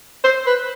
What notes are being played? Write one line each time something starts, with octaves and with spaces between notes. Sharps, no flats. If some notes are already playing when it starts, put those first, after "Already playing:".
C5
B4